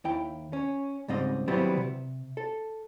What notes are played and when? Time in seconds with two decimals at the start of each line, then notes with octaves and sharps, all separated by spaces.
0.05 D#2 E4 G5
0.53 C#4
1.08 C#2 G#2 G3 C4 D#5
1.47 D#3 F#3 G3 B3 C4 E4
1.77 C3
2.37 A4